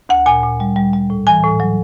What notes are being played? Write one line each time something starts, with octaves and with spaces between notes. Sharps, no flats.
D2 F#5
A#2 G#5
A#2
G3
G3
G3
A2
E3 G#5
A2
F#3